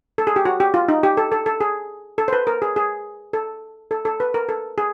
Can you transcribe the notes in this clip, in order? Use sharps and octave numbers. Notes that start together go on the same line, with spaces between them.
A4
G#4
G4
F#4
G4
F4
D#4
G4
A4
A4
A4
G#4
A4
C5
B4
A#4
G#4
G#4
A4
A4
A4
B4
A#4
A4
G#4